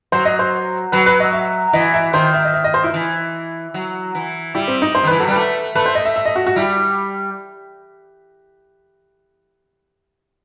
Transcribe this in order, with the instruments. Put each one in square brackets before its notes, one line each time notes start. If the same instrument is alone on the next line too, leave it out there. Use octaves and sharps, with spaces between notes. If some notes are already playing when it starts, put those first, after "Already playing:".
[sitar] F#3 [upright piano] C5
[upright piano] D#5
C5
[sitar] F#3 [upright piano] B4
[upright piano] B4
D#5
E5
[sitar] E3 [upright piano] D#5
[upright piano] E5
[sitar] D#3 [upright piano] C5
[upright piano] E5
D#5
E5
D#5
C5
E4
[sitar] E3
F#3
E3
[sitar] G3 [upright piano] E4
[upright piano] C4
D#4
C5
[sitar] D#3
[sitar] E3 [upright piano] B4
[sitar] F#3 [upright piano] A4
[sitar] G3
[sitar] A3 [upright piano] B4
[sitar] A3 [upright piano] B4
[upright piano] C5
D#5
E5
E5
D#5
F#4
F#4
[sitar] G3 [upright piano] E4